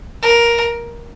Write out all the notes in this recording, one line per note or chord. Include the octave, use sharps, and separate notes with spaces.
A#4